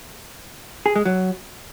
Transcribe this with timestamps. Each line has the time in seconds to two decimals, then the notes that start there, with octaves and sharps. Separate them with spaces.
0.86 G#4
0.96 G#3
1.05 F#3